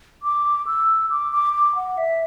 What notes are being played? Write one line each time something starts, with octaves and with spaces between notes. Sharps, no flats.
D6
E6
D6
D6
D6
F#5
E5